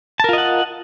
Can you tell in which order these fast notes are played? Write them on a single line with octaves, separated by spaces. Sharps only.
A5 A#4 F4 D#5 F#5